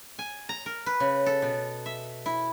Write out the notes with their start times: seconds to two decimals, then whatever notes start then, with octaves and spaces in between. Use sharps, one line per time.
0.19 G#5
0.49 A#5
0.66 A#4
0.86 B4
1.00 C#3
1.26 A4
1.42 B2
1.86 E5
2.26 E4